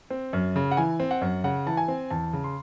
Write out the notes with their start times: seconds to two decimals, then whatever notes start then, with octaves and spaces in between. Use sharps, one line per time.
0.10 C4
0.33 F#2
0.56 C#3
0.71 F#5
0.77 E3 G#5
1.00 C4
1.11 F#5
1.21 F#2
1.44 C#3 F#5
1.66 E3 A5
1.77 G#5
1.88 C4
2.11 E2 A5
2.33 C#3
2.44 C6